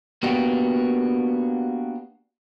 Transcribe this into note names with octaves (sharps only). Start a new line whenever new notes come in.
A#3 B3 D4 F#4 G4